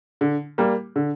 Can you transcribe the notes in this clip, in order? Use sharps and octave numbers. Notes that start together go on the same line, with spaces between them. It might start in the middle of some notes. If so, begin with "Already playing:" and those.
D3
G3 A#3
D3